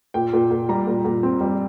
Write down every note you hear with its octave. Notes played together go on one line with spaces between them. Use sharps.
A#2 G5
A#2
A#2
G3 A#5
A#2
A#2
C4
G3